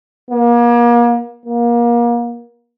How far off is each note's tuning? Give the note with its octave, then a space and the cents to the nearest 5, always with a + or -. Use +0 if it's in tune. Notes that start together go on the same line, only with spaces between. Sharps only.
A#3 +35
A#3 +30